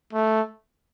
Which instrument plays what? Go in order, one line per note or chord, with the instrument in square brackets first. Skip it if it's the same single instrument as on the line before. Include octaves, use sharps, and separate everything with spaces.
[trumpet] A3